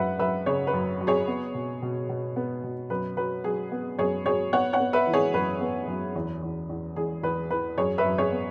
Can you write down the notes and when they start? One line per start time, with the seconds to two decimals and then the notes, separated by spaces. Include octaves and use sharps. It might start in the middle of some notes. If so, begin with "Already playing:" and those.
Already playing: F#2 F#3 B4 E5 F#5
0.19 F#2 B4 E5
0.46 C#3 G#4 C#5
0.67 B4
0.74 F#2
1.01 F#3
1.07 G#4 C#5
1.28 B3
1.55 B2
1.82 B2
2.09 B2
2.36 B3
2.64 B2
2.90 F#2 B4
3.17 F#3 B4
3.44 F#3 G#4
3.72 B3
3.99 F#2 G#4 C#5
4.26 F#3 G#4 C#5
4.53 B3 C#5 F#5
4.73 C#5 F#5
4.80 B3
4.93 B4 E5
5.07 E3
5.13 G#4 C#5
5.34 F#2 B4
5.61 B3
5.88 F#2
6.15 E2
6.42 E2
6.69 E2
6.96 E2 G#4
7.23 E2 B4
7.51 E3 B4
7.78 F#2 G#4 C#5
7.98 B4 E5
8.05 F#2
8.18 G#4 C#5
8.32 B3